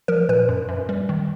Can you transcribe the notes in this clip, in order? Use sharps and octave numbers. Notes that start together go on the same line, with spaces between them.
F3 A#4
A#2 B4
F#2
F#2
G3
D#3